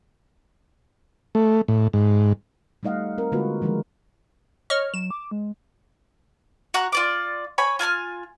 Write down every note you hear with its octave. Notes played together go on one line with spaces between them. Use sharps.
A3
A2
G#2
G3 A3 D#4 D#5 F5 F#5
C4 A#4
D3 G#3 A#3 F4 F#4 B4
D#3 F3 G#3 D4 A#4
C#5 D#5 C#6 F6
F#3 E7
D6
G#3
F#4 F#5 A#5
F4 D5 D6
C#5 G#5 B5
F4 G#5 A5 F6